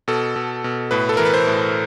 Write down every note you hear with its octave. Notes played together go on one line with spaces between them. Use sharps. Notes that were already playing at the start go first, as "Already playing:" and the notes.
B2 A4
B2
B2
A2 B4
A4
E3 A#4
B4
C5
A2